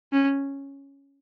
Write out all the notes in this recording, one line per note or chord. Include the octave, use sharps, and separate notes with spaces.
C#4